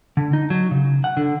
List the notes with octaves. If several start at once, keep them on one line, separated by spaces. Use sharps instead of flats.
D3
D#4
F#3
C#3
F#5
D3